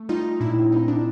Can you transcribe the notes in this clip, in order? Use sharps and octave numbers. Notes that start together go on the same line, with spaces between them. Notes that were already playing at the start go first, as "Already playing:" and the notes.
Already playing: A3
G3 D#4 F4
A#2 D4 E4
C4 D#4
D4